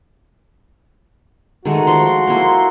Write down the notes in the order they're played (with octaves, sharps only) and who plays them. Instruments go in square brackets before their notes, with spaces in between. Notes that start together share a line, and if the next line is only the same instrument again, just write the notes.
[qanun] D#3 G#3 A3 [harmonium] F#4
[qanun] F3 [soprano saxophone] C6
[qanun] A#3 E4